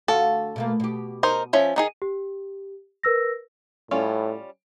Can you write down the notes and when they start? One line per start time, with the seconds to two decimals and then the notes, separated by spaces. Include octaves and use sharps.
0.08 D2 F4 F#4 A4
0.56 B2 A3 A#3
0.80 B2 G4
1.23 D#4 A#4 C5
1.53 F3 C#4 E5
1.76 D#3 D#4 G#4
2.02 G4
3.03 A#4 B4 E6 A#6
3.91 A2 G3 C#4 F4